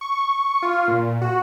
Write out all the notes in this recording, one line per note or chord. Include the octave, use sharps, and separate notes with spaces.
C#6
F4
A#2
F#4